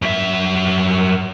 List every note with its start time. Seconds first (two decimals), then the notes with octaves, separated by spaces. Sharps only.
0.02 F#2 E5